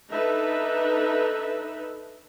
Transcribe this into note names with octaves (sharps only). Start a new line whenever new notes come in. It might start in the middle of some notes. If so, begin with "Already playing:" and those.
D4 D#4 A4 B4 E5